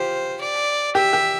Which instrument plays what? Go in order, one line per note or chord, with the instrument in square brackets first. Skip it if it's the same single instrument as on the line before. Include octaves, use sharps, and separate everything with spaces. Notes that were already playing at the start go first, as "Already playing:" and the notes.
Already playing: [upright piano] F4 G4 [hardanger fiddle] C5
[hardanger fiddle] D5
[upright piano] G4 [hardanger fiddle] E5
[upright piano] G4